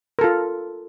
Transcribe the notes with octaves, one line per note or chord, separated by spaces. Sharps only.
F4 A4 A#4